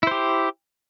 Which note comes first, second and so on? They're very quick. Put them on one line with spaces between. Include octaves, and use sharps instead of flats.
E4 C5 G4